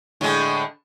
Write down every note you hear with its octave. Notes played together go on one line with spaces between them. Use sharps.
A2 D3 G#3